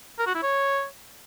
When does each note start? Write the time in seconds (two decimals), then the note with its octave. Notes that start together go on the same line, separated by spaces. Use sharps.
0.18 A#4
0.26 F#4
0.34 E4
0.42 C#5